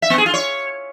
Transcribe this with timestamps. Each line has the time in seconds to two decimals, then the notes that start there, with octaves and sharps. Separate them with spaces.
0.02 E5
0.10 B3
0.18 G#4
0.26 F4
0.34 C#5